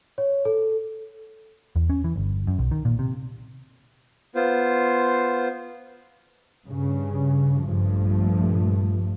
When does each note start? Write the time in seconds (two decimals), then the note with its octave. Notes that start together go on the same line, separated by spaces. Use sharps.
0.18 C#5
0.45 A4
1.76 E2
1.90 C#4
2.04 E3
2.16 G1
2.47 F#2
2.59 B1
2.71 D#3
2.85 A#2
2.99 C3
4.35 B3 F4 C5
6.66 G2 C#3
7.62 A#1 G2 F3 A3